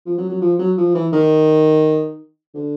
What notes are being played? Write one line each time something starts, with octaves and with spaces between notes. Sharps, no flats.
F3
F#3
F#3
F3
F#3
F3
E3
D#3
D3